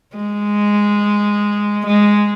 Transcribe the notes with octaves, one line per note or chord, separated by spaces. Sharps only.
G#3
G#3